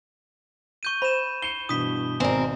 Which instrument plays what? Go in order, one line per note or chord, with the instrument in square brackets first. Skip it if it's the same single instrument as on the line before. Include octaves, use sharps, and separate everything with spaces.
[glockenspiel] C#6 G6 D#7
[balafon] C5 [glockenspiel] B5 E7
[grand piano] C7 C#7 E7 [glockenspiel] G7
[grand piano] G2 B2 E3 [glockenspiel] D#6 B6 G7
[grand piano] G#1 B2 [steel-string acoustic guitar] C4 A#4 [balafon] D5 G#5